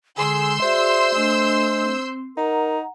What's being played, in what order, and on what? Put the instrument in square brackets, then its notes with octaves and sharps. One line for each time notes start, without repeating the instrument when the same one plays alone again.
[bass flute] D3 [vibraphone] G#3 G#5 [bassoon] G#4 [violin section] C6 E6 G6
[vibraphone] F#4 G#4 D5 [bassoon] C5 [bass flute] E5
[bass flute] A3 [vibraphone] D4 D#5 G#5
[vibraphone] C4
[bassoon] D#4 [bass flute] A#4 [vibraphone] F#5 A#5